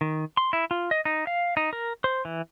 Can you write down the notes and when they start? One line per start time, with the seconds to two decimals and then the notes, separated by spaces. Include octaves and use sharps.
0.01 D#3
0.37 C6
0.53 E4
0.71 F4
0.91 D#5
1.05 D#4
1.27 F5
1.57 D#4
1.73 A#4
2.04 C5
2.25 E3